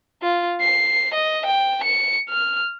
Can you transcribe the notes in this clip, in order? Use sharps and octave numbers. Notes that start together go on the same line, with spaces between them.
F4
C7
D#5
G5
C#7
F6